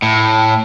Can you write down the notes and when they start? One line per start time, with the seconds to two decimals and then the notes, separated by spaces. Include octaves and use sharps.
0.02 A2